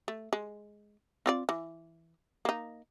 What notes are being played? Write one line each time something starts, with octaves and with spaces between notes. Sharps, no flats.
A3
G#3
C4 F4 D5
E3
A#3 D#4